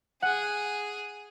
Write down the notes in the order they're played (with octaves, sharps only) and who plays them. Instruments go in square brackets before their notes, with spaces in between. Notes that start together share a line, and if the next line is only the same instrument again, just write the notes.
[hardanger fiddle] G#4 [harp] F#5